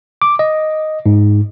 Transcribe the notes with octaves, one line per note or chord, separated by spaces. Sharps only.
D6
D#5
G#2